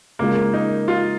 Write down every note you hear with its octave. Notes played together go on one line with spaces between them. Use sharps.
C#3 G#3 A#3 F4 A#4
D#4
F4